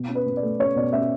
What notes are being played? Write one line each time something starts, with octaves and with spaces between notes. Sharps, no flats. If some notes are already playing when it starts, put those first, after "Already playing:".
Already playing: B2
C#4
B4
B2
D5
A3
C#4 C#5
B2 D5
C#4 E5